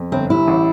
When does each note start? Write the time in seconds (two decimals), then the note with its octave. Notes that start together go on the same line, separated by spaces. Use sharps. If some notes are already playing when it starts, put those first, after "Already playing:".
Already playing: F2
0.12 G1 C4
0.30 G3 E4
0.48 A1